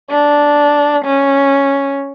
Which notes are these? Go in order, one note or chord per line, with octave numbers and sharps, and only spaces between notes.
D4
C#4